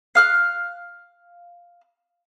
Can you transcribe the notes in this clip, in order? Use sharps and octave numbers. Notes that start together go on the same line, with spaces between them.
F5 F6 F#6